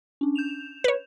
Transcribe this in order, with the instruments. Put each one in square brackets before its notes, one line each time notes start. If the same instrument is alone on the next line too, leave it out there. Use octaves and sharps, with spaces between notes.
[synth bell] C#4 D4
G6 E7 F7
[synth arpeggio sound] B4 C#5